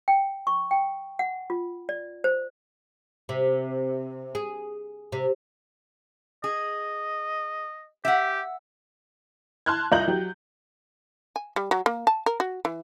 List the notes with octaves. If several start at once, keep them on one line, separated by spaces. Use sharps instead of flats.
G5
C#6
G5
F#5
F4
D5
C5
C3
G#4
C3
G#4 D#5
G4 E5 F#5
A5 C6 F6 F#6 G#6
C2 F4 D#5 A#5 G6 F#7
F#3 G4
G#5
G3
F#3
A#3
A5
A#4
F#4
E3